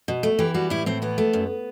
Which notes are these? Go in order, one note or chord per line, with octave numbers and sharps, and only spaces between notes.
B2
A3
E3 G4
G3 F#4
A2 E4
A2 C4
E3 B3
A3
F#2